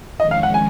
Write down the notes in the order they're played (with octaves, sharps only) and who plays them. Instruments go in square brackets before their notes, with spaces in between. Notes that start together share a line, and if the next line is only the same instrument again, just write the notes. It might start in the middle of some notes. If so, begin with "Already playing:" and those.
[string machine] F2 D#3 G#3 C#4 [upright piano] D#5
[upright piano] F5
F#5
G#5